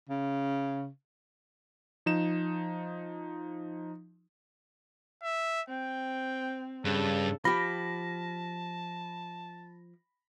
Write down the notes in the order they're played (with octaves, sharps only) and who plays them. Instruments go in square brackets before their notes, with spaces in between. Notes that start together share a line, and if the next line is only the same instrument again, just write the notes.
[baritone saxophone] C#3
[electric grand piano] F3 D#4 E7
[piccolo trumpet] E5
[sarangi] C4 [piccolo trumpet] G5
[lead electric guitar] G2 [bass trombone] C#3 [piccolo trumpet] A4
[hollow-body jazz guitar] F3 G4 [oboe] A5 [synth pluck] B5 [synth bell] A#6